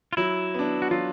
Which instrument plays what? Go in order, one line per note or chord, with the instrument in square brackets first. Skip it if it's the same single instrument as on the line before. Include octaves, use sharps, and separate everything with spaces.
[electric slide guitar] F4
[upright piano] F#3 [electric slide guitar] E4
[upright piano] B3 D4
[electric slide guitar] F#4
[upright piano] F#3 [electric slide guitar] F4